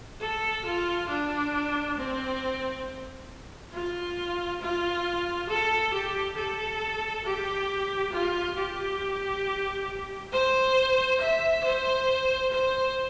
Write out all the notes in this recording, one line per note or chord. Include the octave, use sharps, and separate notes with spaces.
A4
F4
D4
C4
F4
F4
A4
G4
A4
G4
F4
G4
C5
E5
C5
C5